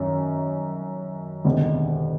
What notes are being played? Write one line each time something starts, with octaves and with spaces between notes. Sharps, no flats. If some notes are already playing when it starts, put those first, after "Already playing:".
Already playing: F#2 D#3 F#3
E1 D2 C3 D#3